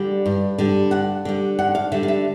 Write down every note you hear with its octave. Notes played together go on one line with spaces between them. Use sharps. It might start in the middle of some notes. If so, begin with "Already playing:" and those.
Already playing: D3 G3
G2
D3 G3
G2 F#5
D3 G3
G2 F#5
F5
D3 G3 E5
F5
E5